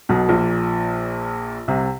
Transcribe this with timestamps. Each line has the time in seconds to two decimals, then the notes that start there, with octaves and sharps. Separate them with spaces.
0.09 B1 B2
0.29 A#1 A#2
1.68 C2 C3